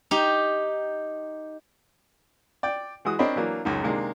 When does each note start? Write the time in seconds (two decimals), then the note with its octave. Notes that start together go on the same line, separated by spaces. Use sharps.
0.11 D#4 G4
2.63 D5 G5
3.05 E3 G#3 F#4 D#6
3.19 C4 D4 A#4 C#5 D#5 B5
3.36 E3 F#3 A#3 D4
3.65 C#2 F#2 D#4
3.83 C3 D#3 G#3 A#3 D4